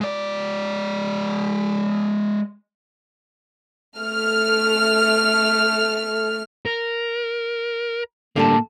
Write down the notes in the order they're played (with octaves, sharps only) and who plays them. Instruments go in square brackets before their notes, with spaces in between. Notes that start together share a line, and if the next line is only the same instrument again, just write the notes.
[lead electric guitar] G#3 D5
[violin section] A3 F6
[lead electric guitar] A#4
[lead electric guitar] A2 A#3 [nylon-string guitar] D3 G3 A5